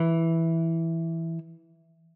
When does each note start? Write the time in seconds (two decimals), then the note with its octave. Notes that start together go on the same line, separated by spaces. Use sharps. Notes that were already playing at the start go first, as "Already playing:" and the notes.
Already playing: E3